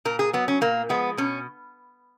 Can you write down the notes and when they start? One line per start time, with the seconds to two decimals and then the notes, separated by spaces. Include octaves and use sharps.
0.05 A#2 A#4
0.19 G#4
0.33 F#3 B3
0.48 C#4
0.61 A#2 A#3
0.89 F3 G#3 B3
1.17 B2 C#4